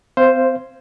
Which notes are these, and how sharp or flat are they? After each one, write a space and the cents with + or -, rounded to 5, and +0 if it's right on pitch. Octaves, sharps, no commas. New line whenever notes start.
C4 -35 C5 +0 F5 -25